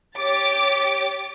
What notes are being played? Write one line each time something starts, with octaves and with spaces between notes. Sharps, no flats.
G4 C#5 D6 A6